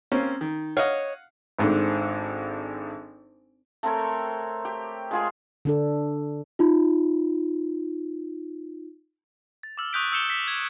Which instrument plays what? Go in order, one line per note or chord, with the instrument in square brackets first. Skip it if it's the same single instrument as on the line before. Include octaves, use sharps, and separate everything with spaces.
[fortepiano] A#3 C4 C#4
D#3
[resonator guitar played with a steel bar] C#5 D#5 [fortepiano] F5 F#5
[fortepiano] G#1 G#2 D4 A4
[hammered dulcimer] A3 C4 A#4 C#5
G4
G#3 F4 G#4
[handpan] D3 D4 A4
[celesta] D#4 F4
[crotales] A6
D6 E6 F6
C#6 D#6 F#6 G6 B6 D7
D#6 E6 G6 C#7 E7 G7
B6 E7
G#6